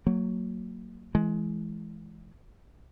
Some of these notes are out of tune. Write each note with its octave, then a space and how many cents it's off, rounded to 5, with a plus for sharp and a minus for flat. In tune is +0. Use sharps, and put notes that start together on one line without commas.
F#3 +0 A#3 -30
E3 +0 G#3 +20